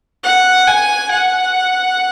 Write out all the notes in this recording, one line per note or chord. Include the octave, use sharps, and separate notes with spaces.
F#5
G#5
F#5